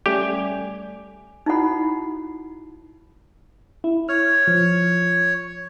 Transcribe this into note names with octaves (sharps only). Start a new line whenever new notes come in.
G3 A3 C#4 G4 D5 G#5
D#4 E4 F#4 F#5 B5
E4
C#5 F6
F3